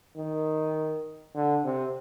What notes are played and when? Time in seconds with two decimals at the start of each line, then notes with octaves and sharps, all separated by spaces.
0.16 D#3
1.35 D3
1.64 C3